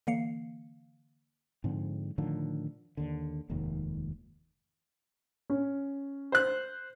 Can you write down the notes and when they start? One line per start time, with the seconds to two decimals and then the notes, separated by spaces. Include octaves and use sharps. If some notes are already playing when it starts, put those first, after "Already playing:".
0.07 D3 E3 A#3 F5 C7 C#7
1.64 G#2 D3 F3 C4
2.18 A2 D3 D#3 F3
2.97 D#2 D3
3.49 F1 D#2 G#2 D#3
5.50 C#4
6.32 C5 F#6